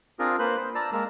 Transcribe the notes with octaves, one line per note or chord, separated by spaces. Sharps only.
C4 D4 F4 G#4 A#4
A#3 B4 C5 F#6
C5
D5 A5 A#5 E6
G#3 A#3 A#5 E6